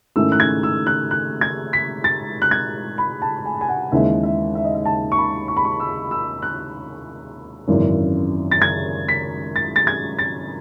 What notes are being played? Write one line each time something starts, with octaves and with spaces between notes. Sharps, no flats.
G#2 D#3 A3 C#4 E4 E6
F#6
G#6
E6
F#6
F#6
G#6
B6
A6
F#6
G#6
B5
A5
G#5
G#5
F#5
D#2 C#3 E3 G#3 D#4 E5
E5
E5
D#5
E5
A5
C#6
B5
C#6
B5
C#6
E6
E6
F#6
G#1 F#2 C#3 E3
A6
G#6
B6
A6
A6
G#6
A6